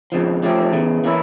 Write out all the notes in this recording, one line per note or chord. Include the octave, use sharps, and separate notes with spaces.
F2 C#3 F3
F3 A3 C#4 G4
E2 C#3 E3
E3 A#3 C#4 E4